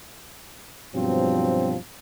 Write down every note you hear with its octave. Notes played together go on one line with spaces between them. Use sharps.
G2 B2 F3 F#3 C4